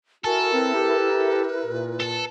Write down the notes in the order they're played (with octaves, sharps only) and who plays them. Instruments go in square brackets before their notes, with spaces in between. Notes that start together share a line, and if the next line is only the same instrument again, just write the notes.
[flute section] E4 A#4 [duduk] F#4 [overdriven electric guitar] A4 [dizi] G#5
[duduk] C4 [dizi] B4
[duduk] G4
A#2
[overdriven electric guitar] A4 A5